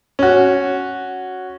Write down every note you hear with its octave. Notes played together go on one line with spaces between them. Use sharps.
C#4 F#4